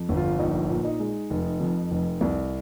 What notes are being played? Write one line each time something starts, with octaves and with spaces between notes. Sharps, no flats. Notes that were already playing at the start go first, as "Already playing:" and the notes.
Already playing: F2
G1
F4
A#1 D#4
A#2
D#4
G#3
F1
F2
F1
C2